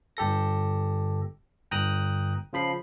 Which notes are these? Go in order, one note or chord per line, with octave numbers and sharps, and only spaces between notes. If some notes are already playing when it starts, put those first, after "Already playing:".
G1 G4 A4 A#6
G1 G5 A#5 D#6 F#6
C#3 F3 B5 C7